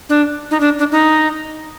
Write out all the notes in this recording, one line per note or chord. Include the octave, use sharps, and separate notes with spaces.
D4
D#4
D4
D4
D#4